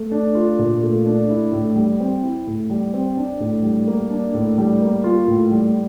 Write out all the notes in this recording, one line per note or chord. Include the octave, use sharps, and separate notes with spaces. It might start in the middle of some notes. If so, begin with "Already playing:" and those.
Already playing: A3
D4
F4
A#2
A3
D4
E4
A2
G3
C4
E4
A2
G3
C4
D4
A2
G3
A#3
D4
A2
G3
A#3
F4
A2
G3